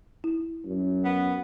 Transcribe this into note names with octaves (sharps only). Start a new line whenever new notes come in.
E4
F#2
B3